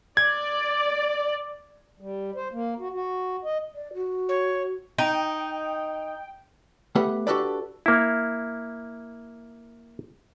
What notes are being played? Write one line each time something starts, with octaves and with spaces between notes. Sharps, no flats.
D5 G#6
G3
C5
A#3
F#4
F#4
D#5
D5
F#4
C#5
D#4 G5
A3 B3 G4 B4 F#5
D4 F#4 G4 A4 B4 D5
A#3 E4